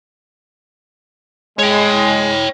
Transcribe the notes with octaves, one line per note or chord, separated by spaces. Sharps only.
G#3 C#5 G5